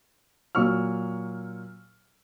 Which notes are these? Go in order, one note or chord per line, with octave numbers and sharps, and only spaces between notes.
A#2 F#3 C#6 E6 F6